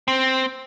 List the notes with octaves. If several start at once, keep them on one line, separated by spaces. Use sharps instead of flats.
C4